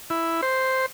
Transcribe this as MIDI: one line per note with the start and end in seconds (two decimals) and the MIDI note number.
0.10 0.41 64
0.43 0.86 72